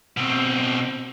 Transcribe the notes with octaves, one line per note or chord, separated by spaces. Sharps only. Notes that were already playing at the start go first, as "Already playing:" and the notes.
B2 C4